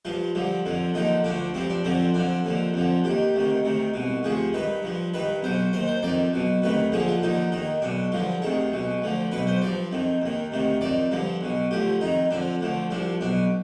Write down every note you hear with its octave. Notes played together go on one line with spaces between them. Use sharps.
G2 F3 F4
G2 D3 F3
F2 D3 F3
D#2 D3 F3 D#4
D2 D3 F3 D4
G2 F3 C4
D4
F2 D3 F3 C4
F2 D3 F3 D4
D#2 D3 F3
F2 D3 F3
D#2 D#3 G4
D2 C3 D#3
D2 C3 D#3
C2 B2
D2 C3 F3 G#4
G2 D#3 B4
G2 F3
G2 D#3 B4
B1 B2 C5
D#2 D#3 C5
C5
F2 D#3 D5
B1 B2
D2 C3 D#3 B4
D#2 D3 F3 G#4
F4
D#2 D3 F3 D#4
D#2 D#3 D#4
B1 B2 D4
G2 D3 F3 F4
D2 C3 D#3 G#4
B1 B2
D2 D3 F3
B1 B2 B4
C5
G2 F3 D5
F2 D#3
D#2 D#3
D2 C3 D#3
F2 D#3 D5
G2 D3 F3
B1 B2
D2 D3 F3 G4
F2 D#3 D#4
F2 D3 F3 D4
D2 D3 F3
C2 C3 F3 D4
B1 B2 D4